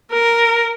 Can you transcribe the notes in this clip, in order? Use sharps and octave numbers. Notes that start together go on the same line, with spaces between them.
A#4